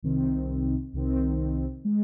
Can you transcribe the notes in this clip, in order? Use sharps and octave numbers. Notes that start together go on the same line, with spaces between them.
C2 C3 D#3 C4
C2 C3 D#3 C4
G#3